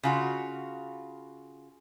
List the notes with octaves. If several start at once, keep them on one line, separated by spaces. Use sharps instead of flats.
C#3 F4 F#4